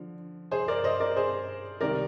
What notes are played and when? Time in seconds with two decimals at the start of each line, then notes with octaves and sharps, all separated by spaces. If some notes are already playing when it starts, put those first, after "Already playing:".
Already playing: D3 F3
0.51 G#4 C5
0.68 A#4 D5
0.84 C5 D#5
1.00 A#4 D5
1.16 G#4 C5
1.81 C2 C3 D#3 G3 A#4 D5